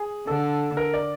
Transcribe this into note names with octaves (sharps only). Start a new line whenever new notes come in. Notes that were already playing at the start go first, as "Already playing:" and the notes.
Already playing: G#4
D3 A4
A#4
D5